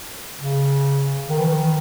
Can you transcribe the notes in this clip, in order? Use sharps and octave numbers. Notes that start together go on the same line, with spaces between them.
C#3
D#3
E3
D#3